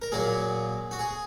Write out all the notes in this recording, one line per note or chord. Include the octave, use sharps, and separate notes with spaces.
A#4
A#2 F#3 A#3 G#4
F#4
G#4